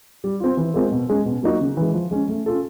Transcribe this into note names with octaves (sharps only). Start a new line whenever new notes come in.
G3
C4 F4
E3
G#3 C4 F4 A#4
B2
G#3 C#4
B2
F#3 A#3 D#4 F#4
C#3
E3 G#3
F3
G#3 C#4
A3
C#4 F4 A4